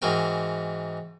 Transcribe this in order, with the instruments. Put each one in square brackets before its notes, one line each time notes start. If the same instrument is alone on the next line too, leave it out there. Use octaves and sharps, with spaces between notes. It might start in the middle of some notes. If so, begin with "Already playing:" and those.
[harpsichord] G#2 E3 F#4 A#4 G5